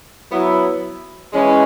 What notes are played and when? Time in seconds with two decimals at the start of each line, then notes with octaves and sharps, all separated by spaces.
0.32 F#3 B3 E4
1.33 E3 G#3 C#4